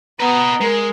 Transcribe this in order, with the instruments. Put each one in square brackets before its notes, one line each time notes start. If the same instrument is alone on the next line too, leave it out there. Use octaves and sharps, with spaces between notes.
[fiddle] B3 [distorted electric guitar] B4 D#5 [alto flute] A#5
[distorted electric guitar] G#3 [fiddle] A#4